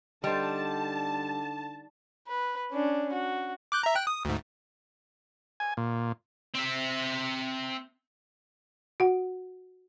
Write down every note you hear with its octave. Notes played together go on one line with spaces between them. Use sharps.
D3 G3 D#4 C5 A5
B4
C#4 D4
F#4
D6 F#6 G6
E5 A#5
G5 F#6
D#6
D2 G#2
G#5
A#2
C4 E5
F#4 F#5